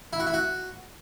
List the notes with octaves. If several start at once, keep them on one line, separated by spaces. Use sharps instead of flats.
E4
F#4
E4
F#4